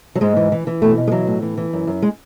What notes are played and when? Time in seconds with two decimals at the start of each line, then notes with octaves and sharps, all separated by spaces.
0.15 F#3
0.21 G#2 G#3
0.36 E3
0.52 E3
0.67 E3
0.82 B2 A3
0.97 B2
1.07 G#3
1.12 E3 F#3
1.27 A2
1.42 E3
1.57 E3
1.73 F#2
1.87 F#2
2.02 G#3